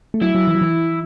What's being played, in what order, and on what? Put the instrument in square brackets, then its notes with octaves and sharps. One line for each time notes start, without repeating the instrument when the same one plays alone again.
[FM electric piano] A3
[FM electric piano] F#3 [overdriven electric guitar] E4
[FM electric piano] F#3
E3
F#3
E3